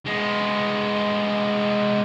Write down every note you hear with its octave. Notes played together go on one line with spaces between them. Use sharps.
G#3 B3